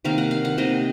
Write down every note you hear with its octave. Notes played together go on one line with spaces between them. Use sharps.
C3 D#3 A#3 F5
F#5
F5
F#5
C3 D#3 A#3 D#5